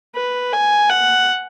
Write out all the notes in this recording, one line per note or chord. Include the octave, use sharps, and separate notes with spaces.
B4
G#5
F#5